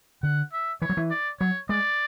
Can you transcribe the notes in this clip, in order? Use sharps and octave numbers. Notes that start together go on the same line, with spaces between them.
D3 F#5
E5
E3 C#5
F#3
E3
D5
F#3 C#5
G#3 D5